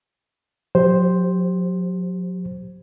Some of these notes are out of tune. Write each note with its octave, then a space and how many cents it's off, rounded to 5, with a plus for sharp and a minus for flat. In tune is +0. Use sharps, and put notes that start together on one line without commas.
F#3 -35 G4 +0 C5 +5